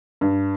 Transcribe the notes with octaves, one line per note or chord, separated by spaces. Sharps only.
G2